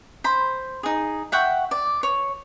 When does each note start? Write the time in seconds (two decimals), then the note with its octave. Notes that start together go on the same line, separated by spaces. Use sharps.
0.24 C5 B5
0.83 D#4 G#4
1.32 E5 F#5 G5 C#6
1.71 D5
2.03 C#5